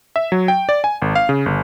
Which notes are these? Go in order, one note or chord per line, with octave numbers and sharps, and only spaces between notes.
E5
F#3
G5
D5
G#5
G#1
F5
C#3
G1